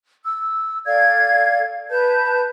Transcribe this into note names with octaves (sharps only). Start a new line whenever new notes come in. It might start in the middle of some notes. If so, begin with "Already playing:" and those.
E6
A4 D5 F5 G#6
B4 A5 G6